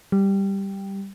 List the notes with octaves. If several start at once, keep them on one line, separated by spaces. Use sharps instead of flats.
G3